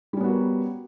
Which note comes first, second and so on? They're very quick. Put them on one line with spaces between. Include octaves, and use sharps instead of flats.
G3 C#4 B3 F#4 A#4